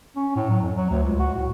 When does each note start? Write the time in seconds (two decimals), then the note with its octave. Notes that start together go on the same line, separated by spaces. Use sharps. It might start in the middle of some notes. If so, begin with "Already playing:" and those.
0.16 C#4
0.36 A2
0.50 F#3
0.62 F2
0.76 F#3
0.90 D2
1.03 C#2
1.19 F#4
1.35 A2